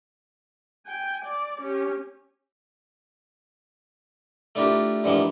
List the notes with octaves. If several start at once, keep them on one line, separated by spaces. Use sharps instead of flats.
G5 G#5
D5
C#4 G4
A3 D4 E4 F4 G4 A#4
G2 D3 E3 F3 G#3 A#3